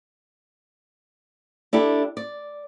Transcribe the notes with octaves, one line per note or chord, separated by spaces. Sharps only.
D4 E4 G4 A4
D5